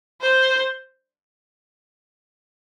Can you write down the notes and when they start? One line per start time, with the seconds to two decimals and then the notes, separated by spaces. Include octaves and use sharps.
0.21 C5